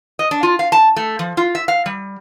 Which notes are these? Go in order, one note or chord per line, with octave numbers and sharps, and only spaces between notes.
D#5
D4
F4
F5
A5
A3
F3
F4
E5
F5
G3